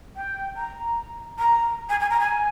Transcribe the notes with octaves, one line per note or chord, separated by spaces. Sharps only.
G5
A#5
A#5
G#5
G#5
A#5
G#5